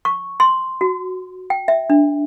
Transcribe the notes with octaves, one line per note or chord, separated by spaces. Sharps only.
C#6
C6
F#4
G5
E5
D4